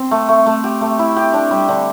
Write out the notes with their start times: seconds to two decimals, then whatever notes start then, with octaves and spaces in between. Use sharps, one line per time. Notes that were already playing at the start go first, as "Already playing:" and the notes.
Already playing: C4
0.11 A3
0.29 A3
0.46 A3
0.64 G4
0.81 A3
0.99 E4
1.17 G4
1.34 D4
1.51 G3
1.69 D3